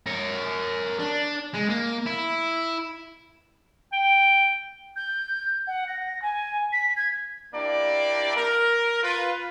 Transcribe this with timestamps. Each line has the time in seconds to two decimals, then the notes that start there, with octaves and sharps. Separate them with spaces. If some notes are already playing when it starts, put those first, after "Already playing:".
0.07 A#4 C#5
1.00 D4
1.54 G#3
1.70 A#3
2.06 E4
3.93 G5
4.96 G6
5.67 F#5
5.88 A#6
6.22 G#5
6.73 B6
6.96 G#6
7.54 A#3 D4 E4 G4 D5
8.37 A#4
9.03 F4 B4